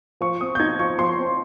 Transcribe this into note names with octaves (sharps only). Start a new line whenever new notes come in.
F3 C#6
C4 D#6
G6
D#4 G#6
F3 C#6
F3 C6
C4